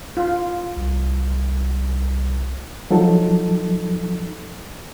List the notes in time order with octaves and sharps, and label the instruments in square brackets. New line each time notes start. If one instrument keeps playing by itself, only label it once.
[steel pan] F4
[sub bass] C2
[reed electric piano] F3 F#3 D#4 A4